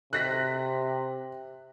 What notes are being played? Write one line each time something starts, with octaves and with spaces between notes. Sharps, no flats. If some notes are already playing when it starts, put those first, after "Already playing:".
C3 F#6 A#6 B6